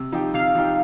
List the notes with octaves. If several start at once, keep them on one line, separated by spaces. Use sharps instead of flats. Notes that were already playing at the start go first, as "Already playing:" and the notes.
Already playing: C3
F3 D#4 G4
C3 F5
F3 D#4 G4